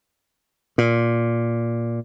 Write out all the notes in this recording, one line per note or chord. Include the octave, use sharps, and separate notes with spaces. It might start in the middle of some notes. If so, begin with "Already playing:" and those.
A#2